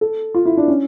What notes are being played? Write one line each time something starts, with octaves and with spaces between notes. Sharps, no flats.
A4
F4
E4
D4
C#4